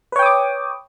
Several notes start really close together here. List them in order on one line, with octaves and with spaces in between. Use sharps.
B4 C#5 G5 D#6 D6